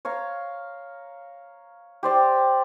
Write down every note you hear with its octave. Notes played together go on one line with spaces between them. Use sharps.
C#5 F5 A#5
G4 C5 D5 G5